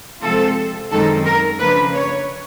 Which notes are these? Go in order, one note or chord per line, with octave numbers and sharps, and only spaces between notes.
C3 F3 G#3 C4 F4 A4
F#2 D#3 G#3 C4 D#4 A4
A#4
C#3 F3 A#3 D4 B4
C#5